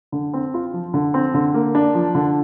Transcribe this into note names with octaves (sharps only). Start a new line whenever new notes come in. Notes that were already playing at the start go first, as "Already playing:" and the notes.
D3
C4
F4
F3
D3
C4
D3
A#3
D4
F3
D3